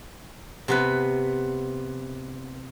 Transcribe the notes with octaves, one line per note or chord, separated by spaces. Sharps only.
C3 B3 B4